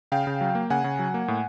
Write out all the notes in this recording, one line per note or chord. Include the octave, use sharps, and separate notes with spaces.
C#3 F5 G5
C#3
F#3
A#3
C#3 F#5 G#5
C#3
F#3
A#3
A2